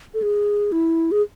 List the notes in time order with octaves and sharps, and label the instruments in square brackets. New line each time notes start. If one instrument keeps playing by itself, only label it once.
[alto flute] A4
G#4
E4
G#4